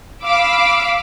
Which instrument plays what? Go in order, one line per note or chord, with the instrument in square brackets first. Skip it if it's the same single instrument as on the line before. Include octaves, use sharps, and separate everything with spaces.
[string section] F5 B5 D6 E6